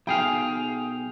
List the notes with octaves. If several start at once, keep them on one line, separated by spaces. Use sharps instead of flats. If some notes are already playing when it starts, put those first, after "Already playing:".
B1 G#4 F5 G5